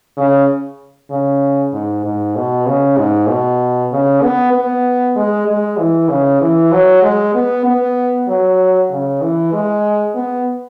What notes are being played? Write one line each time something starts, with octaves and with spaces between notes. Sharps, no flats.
C#3
C#3
G#2
G#2
B2
C#3
G#2
B2
C#3
B3
B3
G#3
G#3
E3
C#3
E3
F#3
G#3
B3
B3
F#3
C#3
E3
G#3
B3